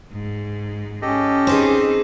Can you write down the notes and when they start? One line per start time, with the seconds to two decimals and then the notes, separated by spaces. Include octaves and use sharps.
0.12 G#2
1.02 C#4 G4 A4 D#5
1.47 C4 D#4 G#4 B4 C5